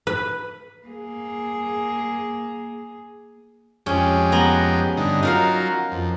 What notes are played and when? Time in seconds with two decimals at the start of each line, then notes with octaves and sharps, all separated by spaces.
0.07 B4
0.87 A#3 G#4
3.86 F2 G#3 C#4 G4
4.32 B3 A#5
4.97 G2 D3 D#4
5.23 F#3 D#4 F4 A#4 F5
5.92 F2